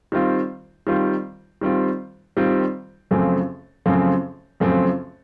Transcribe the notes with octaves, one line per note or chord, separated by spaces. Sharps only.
D#3 G3 C4 F4
D#3 G3 C4 F4
D#3 G3 C4 F4
D#3 G3 C4 F4
F#2 C#3 F3 A3 C4
F#2 C#3 F3 A3 C4
F#2 C#3 F3 A3 C4